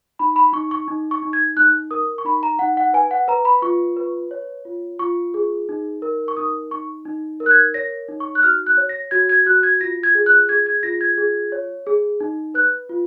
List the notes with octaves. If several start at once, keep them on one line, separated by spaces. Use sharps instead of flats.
D#4 B5
B5
D#4 C#6
C#6
D#4
C#6
D#4
G#6
D#4 F#6
A#4 D#6
C#6
D#4 B5
A#5
D#4 F#5
F#5
B4 G#5
F#5
B4 A#5
B5
F4 C#6
B4
C#5
F4
F4 C#6
G#4
D#4
A#4
C#6
D#4 D#6
D#4 C#6
D#4
A#4
F#6
G#6
C#5 A#6
D#4
C#6
F#6
F#4 F6
F#6
C#5
A#6
F#4 G#6
G#6
F#4 F#6
G#6
F4 A#6
G#6
G#4
F#6
G#4 G#6
G#6
F4 A#6
G#6
G#4
C#5
G#4
D#4
B4 F#6
F4